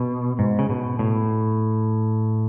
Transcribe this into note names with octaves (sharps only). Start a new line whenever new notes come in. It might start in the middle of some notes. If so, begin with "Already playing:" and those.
Already playing: B2
G#2
C#3
B2
A2